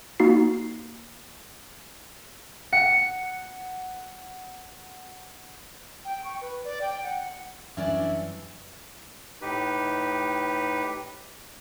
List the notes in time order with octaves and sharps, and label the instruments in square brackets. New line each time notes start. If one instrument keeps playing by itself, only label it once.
[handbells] A#3 D#4 F#4 C7
[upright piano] F#5 [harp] C#7
[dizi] G5
C#6
B4
D5
G5
F#5
[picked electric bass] F#2 F#3 G3 [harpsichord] E3 [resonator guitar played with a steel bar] C#4 D4 D5 [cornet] E5
[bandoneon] A2 D#4 G4 B4